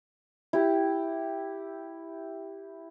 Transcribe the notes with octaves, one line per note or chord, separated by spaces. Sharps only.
E4 G4